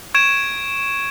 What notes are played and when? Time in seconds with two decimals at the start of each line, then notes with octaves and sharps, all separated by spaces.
0.14 C#6 G#6 D7 E7